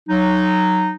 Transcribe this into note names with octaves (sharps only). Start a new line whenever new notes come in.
F#3 D#4